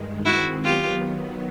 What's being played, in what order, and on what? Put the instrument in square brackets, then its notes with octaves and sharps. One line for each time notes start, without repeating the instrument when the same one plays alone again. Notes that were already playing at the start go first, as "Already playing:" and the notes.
Already playing: [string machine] G2 D#3 G#3
[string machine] D#3 G#3 C4 [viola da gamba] E4 F#4
[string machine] D#3 F#3 B3 [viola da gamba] F4 G4